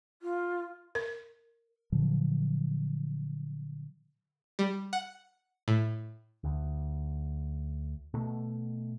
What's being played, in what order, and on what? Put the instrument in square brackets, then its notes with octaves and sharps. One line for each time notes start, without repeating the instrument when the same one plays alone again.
[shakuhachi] F4
[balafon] A#4
[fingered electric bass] A#2 D3 F3 F#3
[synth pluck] G3
F#5
A2
[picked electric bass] D2
B2 A3